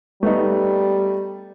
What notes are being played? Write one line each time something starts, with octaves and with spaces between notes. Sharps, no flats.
G3 A3 B3 D#4